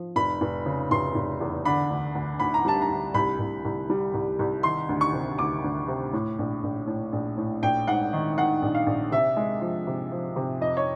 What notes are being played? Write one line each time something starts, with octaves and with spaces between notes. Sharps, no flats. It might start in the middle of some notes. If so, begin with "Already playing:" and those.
Already playing: F3
F1 B5
F1
C#3
F1 C6
F1
E2
D3 B5
D2
D2
D2 B5
A#5
G3 A5
A#5
D2
C2 B5
C2
C2
G3
C2
C2
D#3 C6
D2
C#6
C3
D2 D6
D2
C3
A2
A#1
A#1
A2
A#1
A2
A#1 G5
G#2 F#5
D#3
D#3 F#5
A#1
F5
A#1
C3 E5
G#3
F3
C3
F3
C3
F2 D#5
C#5